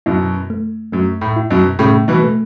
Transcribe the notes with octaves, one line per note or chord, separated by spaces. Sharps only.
F#2 B2 E4
A3
F#2 A3
A2
E4
F#2 B2
A2 C#3 A3
B2 E3
A3